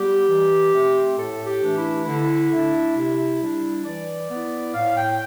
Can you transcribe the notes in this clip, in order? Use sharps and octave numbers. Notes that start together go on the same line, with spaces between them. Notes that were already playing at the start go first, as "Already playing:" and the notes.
Already playing: G3 B3 G4
E3
A3 C4
A2 A4
G4
E3 A3 D4
E4
D3 E4
A3 D4
C3
G3 D4
E3 D5
B3
E4
A2 F5
G5